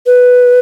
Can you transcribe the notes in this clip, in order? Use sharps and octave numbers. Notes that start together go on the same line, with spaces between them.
B4